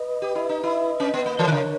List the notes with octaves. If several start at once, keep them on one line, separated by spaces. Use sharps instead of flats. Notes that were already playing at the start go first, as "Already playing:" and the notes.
Already playing: B4 D#5
G4
E4
D#4
E4
C#4
B3
A#3
E3 A#4 C#5
D#3
C#3